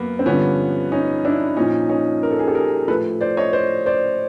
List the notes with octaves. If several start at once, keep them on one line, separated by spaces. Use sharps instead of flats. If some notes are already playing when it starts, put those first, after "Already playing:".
Already playing: F#2 A#3 B3
C4
G2 D3 F3 B3 C#4
C#4 D#4
D4 E4
A#2 F3 C#4 D#4
C#4 D#4
A#4
A4
G#4
G4 A4
G#4 A#4
A2 F3 A4 B4
C5 D5
C#5 D#5
C5 D5
C5 D5